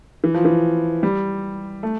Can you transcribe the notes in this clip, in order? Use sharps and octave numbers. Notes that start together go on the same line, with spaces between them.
E3
F3
E3
G3
A3